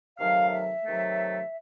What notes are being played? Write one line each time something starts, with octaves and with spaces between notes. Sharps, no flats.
C3 D#3 F#3 A3 F5
E5
C3 D#3 F#3 A3